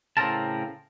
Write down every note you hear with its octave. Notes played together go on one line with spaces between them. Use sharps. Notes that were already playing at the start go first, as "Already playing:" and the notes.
A2 C#3 C4 A#4 A5